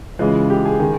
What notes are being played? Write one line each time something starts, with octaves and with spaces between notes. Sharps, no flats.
C#3 E3 G#3 F4
G4
G#4
D#3